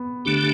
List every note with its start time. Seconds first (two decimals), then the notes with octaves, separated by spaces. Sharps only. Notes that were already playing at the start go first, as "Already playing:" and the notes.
Already playing: B3
0.25 D3 A3 D4 G4